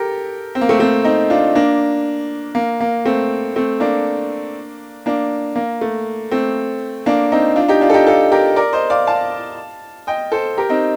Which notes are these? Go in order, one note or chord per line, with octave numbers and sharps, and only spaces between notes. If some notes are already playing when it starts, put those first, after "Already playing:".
Already playing: G4 A4 A#4
C4
A#3
A3 C4
A3 C4
C4 D#4
D4 F4
A#3 D4
A#3
A#3
A3 C4
A3 C4
A#3 D4
A#3 D4
A#3
A3
A3 C4
A#3 D4
C4 D#4
D4 F4
D#4 G4
D4 F4
A4
D#4 G4
F4 A4
G4 A#4
A#4 D5
C5 D#5
D5 F5
F5 A5
D#5 G5
A4 C5
G4 A#4
C4 D#4